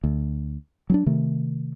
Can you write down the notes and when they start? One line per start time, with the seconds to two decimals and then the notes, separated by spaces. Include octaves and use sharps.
0.04 D2
0.90 F#3 C#4 D4
1.06 C3 D#3 A3